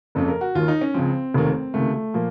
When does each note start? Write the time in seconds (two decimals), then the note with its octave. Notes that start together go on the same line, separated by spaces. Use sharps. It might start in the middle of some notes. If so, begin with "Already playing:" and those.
0.15 F#1 F2 C#3 A4
0.28 A#4
0.41 F#4
0.55 D#2 D#3 F4
0.68 D#4
0.81 C#4
0.94 C#2 C#3 F3 C4
1.34 F1 D#2 D#3
1.74 C#2 C3 D#3 A3
1.94 A3
2.14 A#2 F3 A#3